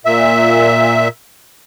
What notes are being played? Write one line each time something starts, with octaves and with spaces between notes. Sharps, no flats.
A#2 E5